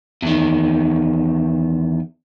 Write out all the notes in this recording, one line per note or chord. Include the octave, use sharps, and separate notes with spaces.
E2 D#3